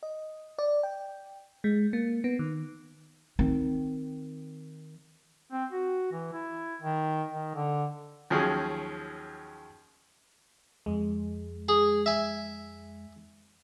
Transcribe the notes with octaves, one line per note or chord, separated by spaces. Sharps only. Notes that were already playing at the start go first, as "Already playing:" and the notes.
D#5
D5
G5
G#3
A#3
B3
D#3
D#3 C4
C4
F#4
E3
E4
D#3
D#3
D3
D#2 F3 F#3 C#4 G#4
F2 G#3
G#4
E5 G#5